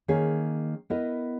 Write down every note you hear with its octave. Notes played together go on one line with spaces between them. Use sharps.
D#3 A#3 C#4 G#4
B3 E4 A#4 D#5